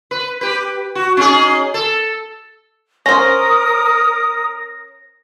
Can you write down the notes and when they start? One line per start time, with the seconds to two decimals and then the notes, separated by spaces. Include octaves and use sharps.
0.11 B4
0.41 G4 B4
0.95 F#4
1.17 C#4 D#4 G#4
1.74 A4
3.06 C#4 A#4 C5 D#6 A#6